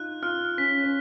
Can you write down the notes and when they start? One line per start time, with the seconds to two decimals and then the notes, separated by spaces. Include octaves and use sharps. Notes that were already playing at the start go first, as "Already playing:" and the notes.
Already playing: D#4 F4 F#6
0.22 F4 F6
0.58 C#4 B6
0.84 C#4